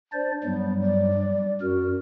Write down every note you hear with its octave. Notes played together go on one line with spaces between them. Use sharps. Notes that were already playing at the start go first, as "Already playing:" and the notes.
D4 C5 D5
G2 F#3 G3 B3
D5
G3
F#2 F#4 A#4